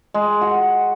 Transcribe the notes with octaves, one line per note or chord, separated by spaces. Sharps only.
G#3
F#4